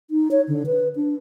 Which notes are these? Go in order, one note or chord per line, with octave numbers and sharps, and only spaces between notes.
D#4
C#5
D3
B4
D4